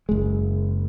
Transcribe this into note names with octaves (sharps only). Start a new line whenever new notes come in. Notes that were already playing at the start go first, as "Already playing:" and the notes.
F#1 G#3